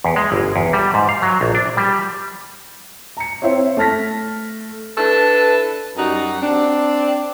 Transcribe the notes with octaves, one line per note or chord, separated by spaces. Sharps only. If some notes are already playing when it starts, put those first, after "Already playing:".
E2
G#3
G1
E2
G3
G#2
F5
F#3
A#1
D4
G3
A#5 C#7
C4 E4 C5 C#5
A3 A5 F6 A#6 B6
D4 E4 A4 B4
F#2 G3 D#4 F#4 F#5
C4 D4